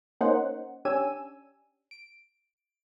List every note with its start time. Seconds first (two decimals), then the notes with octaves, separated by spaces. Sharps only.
0.21 A#3 C#4 D#4 C5 F#5
0.85 C#4 D4 G4 G#5 E6 D#7
1.91 D7